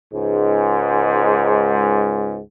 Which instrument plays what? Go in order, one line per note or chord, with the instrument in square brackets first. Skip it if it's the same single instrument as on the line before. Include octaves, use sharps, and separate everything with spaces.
[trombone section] C#2 G#2